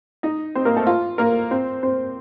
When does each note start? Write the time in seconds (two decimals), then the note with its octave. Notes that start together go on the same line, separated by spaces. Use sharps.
0.23 D#4 D#5
0.55 C4 C5
0.65 A#3 A#4
0.76 A3 A4
0.87 F4
1.18 A#3 A#4
1.51 C4 C5
1.83 C4 C5